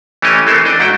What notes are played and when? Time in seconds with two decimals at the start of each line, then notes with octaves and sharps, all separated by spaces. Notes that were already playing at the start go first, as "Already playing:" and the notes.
0.22 E3 A3 C#4 G4 C#5 D#5
0.46 E3 A3 C4 A4 A#4 C5
0.65 D4 D#5 G5
0.79 G#2 A3 E4 F#4 G5